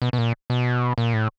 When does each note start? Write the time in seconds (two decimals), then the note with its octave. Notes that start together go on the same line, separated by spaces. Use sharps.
0.02 B2
0.13 B2
0.18 A#2
0.50 B2
0.98 A#2
1.14 A2